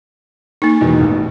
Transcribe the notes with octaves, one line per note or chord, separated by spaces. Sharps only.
A#3 D#4
E2 B2 D#3
A1